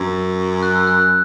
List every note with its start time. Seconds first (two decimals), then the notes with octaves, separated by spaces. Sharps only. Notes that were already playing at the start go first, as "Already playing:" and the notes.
Already playing: F#2 E6
0.63 F#6
0.76 E6
0.87 F#6